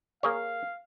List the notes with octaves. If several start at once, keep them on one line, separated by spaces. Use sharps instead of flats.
A#3 G#4 C#5 F5